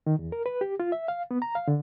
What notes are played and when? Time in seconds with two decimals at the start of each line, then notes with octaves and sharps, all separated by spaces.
0.06 D#3
0.19 E2
0.32 A#4
0.46 B4
0.61 G4
0.80 F4
0.92 E5
1.08 F5
1.31 B3
1.42 A#5
1.55 F5
1.68 D3